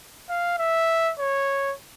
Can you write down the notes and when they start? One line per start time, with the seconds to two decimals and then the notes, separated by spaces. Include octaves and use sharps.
0.29 F5
0.59 E5
1.19 C#5